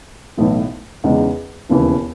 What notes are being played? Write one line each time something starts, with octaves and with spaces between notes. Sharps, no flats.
B1 A2 E3
E2 C#3 G#3 D#4
E1 D#2 C#3 E3